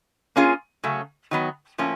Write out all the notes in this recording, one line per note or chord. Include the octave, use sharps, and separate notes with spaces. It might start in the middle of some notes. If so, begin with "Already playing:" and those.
A#3 C#4 F4 G#4
C#3 F#3 A3 C#4
D#3 F#3 B3
A2 F3 A#3 C#4